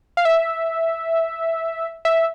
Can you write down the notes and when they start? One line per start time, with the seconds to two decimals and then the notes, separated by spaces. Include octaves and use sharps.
0.17 F5
0.25 E5
2.05 E5